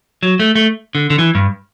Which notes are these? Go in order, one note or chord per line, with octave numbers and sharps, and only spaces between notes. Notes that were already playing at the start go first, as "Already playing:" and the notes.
F#3
A3
A3
D3
D3
E3
G2